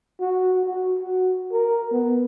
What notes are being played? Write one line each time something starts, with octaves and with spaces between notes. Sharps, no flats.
F#4
F#4
F#4
A#4
B3